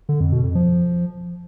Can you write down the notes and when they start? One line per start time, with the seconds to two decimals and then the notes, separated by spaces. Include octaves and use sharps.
0.09 D3
0.20 F2
0.32 B2
0.44 F2
0.55 F3